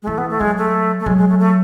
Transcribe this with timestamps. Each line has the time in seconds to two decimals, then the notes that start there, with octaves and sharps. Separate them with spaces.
0.02 G#3
0.07 E3 A3
0.18 B3
0.30 A3
0.40 F#3 G#3
0.57 A3
1.00 A3
1.06 F#3 G#3
1.17 G#3
1.29 A3
1.39 A3